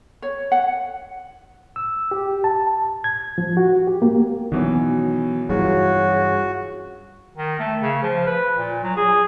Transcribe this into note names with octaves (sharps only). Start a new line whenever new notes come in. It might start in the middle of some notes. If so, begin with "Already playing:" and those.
C#5
F#5
E6
G4
A5
G#6
F3
F#4
G4
A#3
B2 D#3 E3 F#3 C#4
G2 C#3 E3 F#3 C#4 F4 F#4
D#3
A3
C#3
F3
B4
A#2
F#3
G#4